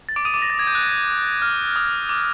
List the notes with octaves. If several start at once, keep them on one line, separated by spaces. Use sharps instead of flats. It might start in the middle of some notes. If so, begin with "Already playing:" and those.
A6
D6 D7
D#6 D#7
D6 D7
A#6
A6
G#6
G6
F#6
F6
D#6
D6